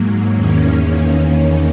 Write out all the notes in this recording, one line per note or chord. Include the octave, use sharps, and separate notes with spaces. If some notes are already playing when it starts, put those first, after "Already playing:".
Already playing: G#2 F#3 A#3
E2 D#3 A#3 C#4